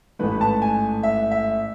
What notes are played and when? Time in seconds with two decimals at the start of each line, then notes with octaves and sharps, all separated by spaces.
0.19 A1 G#2 E3 A3 B4
0.41 A5
0.62 G#5
1.03 E5
1.31 E5